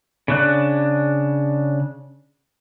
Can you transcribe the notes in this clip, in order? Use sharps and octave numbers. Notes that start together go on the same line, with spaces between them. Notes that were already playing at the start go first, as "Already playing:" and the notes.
C#3 D4 F#6